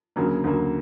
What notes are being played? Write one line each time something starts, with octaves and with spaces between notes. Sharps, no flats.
D2 C#3 F#3 A#3
D2 C#3 F#3 A#3